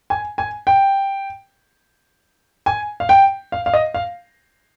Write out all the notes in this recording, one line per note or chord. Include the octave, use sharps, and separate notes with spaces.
G#5
G#5
G5
G#5
F5
G5
F5
F5
D#5
F5